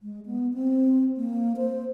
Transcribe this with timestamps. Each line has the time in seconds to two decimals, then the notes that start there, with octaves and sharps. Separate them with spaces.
0.02 G#3
0.26 B3
0.54 C4
1.17 A#3
1.57 C5